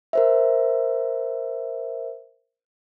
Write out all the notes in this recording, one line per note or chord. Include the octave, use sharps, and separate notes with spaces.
A#4 C5 E5